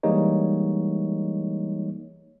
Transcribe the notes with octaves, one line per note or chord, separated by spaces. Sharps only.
E3 G3 G#3 A#3 D#4 C#5